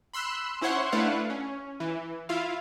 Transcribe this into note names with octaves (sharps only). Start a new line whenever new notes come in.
B5 C6 E6 F#6
C#4 E4 C5 C#5 F#5 C6
A3 D4 E4 B4 F5 F#5
C#4
E3
E4 F4 F5